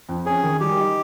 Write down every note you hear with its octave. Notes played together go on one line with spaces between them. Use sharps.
F2
C#4 G#4
D#3
G3 G4
D#4